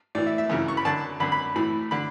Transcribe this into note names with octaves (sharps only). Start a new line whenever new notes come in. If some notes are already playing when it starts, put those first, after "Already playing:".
A2 E3 D5
E5
E5
F#2 C#3 E3
C#6
B5
F#2 D3 A5
F#2 D3 B5
B5
A2 E3 B5
D3 B5